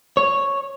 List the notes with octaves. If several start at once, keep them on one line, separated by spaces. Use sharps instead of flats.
C#5